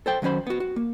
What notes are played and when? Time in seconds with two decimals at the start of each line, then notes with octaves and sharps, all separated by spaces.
0.06 A4 C5 G5
0.22 D#3 F#3 C#4 C5 B5
0.47 B3 F#4
0.60 F#4
0.76 A#3